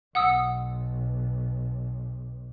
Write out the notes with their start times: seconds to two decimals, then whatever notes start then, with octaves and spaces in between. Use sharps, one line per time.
0.15 B1 F#5 D#6 E6